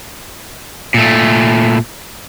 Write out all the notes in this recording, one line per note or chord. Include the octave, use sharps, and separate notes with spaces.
A#2 A3